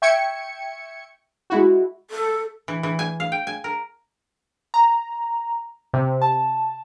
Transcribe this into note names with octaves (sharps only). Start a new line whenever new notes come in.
E5 G5 C#6 G#6 C#7
G#3 E4 F#4
A4
E3
E3
G#5
F5
G5
G#5
A#4
A#5
C3
A5